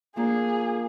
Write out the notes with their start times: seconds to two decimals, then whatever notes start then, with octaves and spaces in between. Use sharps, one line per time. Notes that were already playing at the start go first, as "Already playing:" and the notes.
0.16 F3 A#3 D4 G#4